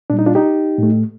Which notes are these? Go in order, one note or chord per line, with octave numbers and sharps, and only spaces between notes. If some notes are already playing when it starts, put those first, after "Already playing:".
A#2 G3 D4
D#4
D4 F4
D#4 G4
A2 A3